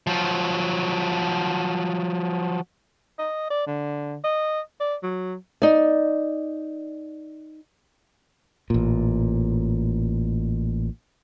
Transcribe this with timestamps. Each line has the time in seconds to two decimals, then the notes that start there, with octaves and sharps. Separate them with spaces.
0.07 F3 F#3
3.19 D#5
3.50 D5
3.67 D3
4.24 D#5
4.80 D5
5.03 F#3
5.62 D#4 D5
8.70 A1 A#2